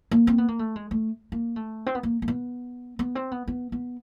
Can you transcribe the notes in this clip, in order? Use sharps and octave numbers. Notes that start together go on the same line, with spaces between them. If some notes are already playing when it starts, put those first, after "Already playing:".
A#3
C4
B3
A#3
A3
G#3
A3
A#3
A3
C4
B3
A#3
A#3
B3
B3
C4
B3
B3
B3